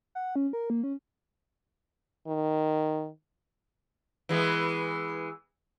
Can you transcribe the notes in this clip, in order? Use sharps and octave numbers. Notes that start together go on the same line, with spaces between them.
F#5
C#4
A#4
A#3
C#4
D#3
E3 G#3 B3